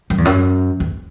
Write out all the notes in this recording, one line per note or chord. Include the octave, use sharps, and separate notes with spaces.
F#2
E2
F#2
E2